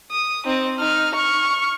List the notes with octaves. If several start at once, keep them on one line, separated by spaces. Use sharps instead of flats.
D#6
C4 D#4
D#4 F6
C#6 F6